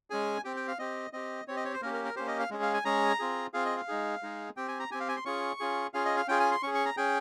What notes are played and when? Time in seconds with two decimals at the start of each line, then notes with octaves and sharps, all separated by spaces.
0.10 G#3 C#4 G#4 G#5
0.44 C4 G4 G5
0.57 G5
0.68 F5
0.79 C4 G4 D#5
1.13 C4 G4 D#5
1.48 C4 G4 C#5
1.56 D#5
1.65 C#5
1.74 C5
1.82 A#3 C#4 G4 A#4
1.94 A#4
2.05 A#4
2.16 A#3 C#4 G4 C5
2.28 D#5
2.39 F5
2.50 G#3 C#4 G#4
2.62 F5
2.74 G#5
2.85 G#3 C#4 G#4 A#5
3.19 C4 F4 G#4
3.53 C4 F4 G#4 F5
3.65 D#5
3.77 F5
3.88 G#3 D#4 G#4
4.23 G#3 D#4 G#4
4.57 C4 G4 G5
4.68 G#5
4.80 A#5
4.91 C4 G4 G#5
5.00 F5
5.09 G#5
5.16 C6
5.25 C#4 F4 G#4 C#6
5.60 C#4 F4 G#4
5.94 C#4 F4 G#4 F5
6.05 D#5
6.17 F5
6.28 C#4 F4 G#4 G5
6.40 G#5
6.52 C6
6.63 C#4 G#4 C#6
6.74 C#6
6.85 A#5
6.97 C#4 G#4 G5